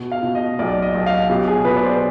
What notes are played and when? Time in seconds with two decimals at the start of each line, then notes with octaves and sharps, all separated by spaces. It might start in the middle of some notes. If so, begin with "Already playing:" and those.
Already playing: B2
0.12 F5
0.23 B2
0.35 D#5
0.59 B1 D5
0.82 D#5
0.95 B1
1.06 F5
1.30 B2 G4
1.48 G#4
1.65 B2 B4
1.77 D5
1.83 C5